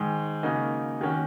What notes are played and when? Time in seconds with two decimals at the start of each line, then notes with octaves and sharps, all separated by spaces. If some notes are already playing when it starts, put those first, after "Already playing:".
Already playing: G#2 D#3 G#3
0.43 C#3 A#3 D#4 F#4
1.01 D#3 A#3 C#4 F#4